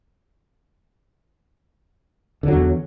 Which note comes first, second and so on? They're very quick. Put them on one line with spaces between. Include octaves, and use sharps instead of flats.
D3 F#3 E2